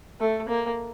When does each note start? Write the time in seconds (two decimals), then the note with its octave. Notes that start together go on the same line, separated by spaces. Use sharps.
0.20 A3
0.48 A#3